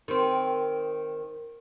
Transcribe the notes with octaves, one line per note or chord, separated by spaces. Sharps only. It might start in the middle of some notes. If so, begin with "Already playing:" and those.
D#3 C4